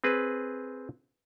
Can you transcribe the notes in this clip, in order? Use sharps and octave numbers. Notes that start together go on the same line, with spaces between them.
C4 G#4 B4